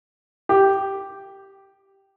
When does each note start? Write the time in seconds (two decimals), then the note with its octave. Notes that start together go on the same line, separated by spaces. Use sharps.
0.49 G4